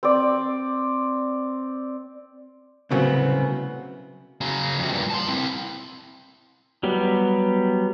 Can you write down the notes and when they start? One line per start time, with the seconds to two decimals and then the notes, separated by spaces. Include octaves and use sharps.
0.03 C4 D5
2.91 C2 A2 C#3 F#3 B3 C4
4.41 C#3 F#3
4.79 F2 C3
4.92 G2 A#2
5.10 A5 C6
5.28 C4 E4
6.83 F#3 G3 B3